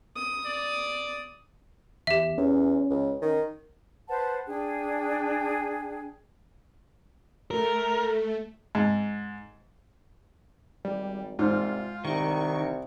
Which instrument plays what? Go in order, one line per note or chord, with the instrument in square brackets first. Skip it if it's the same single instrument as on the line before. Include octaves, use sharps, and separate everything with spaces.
[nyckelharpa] D#6
[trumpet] D5
[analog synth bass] E2 [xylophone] G4 E5
[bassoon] E2 [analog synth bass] C#4
[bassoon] C#2
D#3
[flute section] B4 C5 F#5 A5
D4 G#4 G5
[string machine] A3 [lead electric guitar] A#4
[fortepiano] G#2
[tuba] G#1 [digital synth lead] G3
[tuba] C2 [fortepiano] G#2 C5 [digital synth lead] F4
[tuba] C2 [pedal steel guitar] D#3 [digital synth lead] C#6